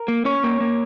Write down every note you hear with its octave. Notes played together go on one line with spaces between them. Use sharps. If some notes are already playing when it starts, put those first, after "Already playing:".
Already playing: A#4
A#3
C#4 C#5
A#3
A#3